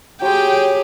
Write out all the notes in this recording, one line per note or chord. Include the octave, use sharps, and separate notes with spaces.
F#3 G4 G#4 C#5 G5 C6